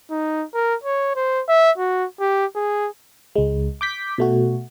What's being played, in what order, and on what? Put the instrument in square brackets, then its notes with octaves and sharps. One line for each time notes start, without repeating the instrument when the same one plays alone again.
[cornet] D#4
A#4
C#5
C5
E5
F#4
G4
G#4
[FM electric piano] C#2 G#3
D6 G6 B6
B2 A3 F#4